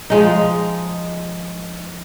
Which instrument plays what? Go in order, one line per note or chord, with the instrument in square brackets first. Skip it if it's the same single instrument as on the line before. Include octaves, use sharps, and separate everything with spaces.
[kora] F3 G#3 D#4